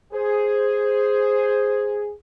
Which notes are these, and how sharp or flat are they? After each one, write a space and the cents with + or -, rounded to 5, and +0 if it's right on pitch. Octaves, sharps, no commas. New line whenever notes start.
G#4 +0 C5 +0